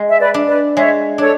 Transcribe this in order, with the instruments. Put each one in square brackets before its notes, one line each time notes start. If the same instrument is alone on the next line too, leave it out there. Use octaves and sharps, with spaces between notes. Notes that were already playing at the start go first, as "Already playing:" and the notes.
Already playing: [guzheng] G#3
[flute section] E5
B4 D5
[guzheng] D4
[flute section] B4 D5
[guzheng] G#3 [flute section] C#5 E5
[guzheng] D4 [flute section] A4 C#5